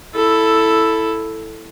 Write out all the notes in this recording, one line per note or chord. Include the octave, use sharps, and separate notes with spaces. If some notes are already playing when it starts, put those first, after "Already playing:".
E4 A4